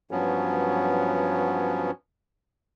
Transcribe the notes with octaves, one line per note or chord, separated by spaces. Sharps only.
G2 F3 F#3 B3 C#4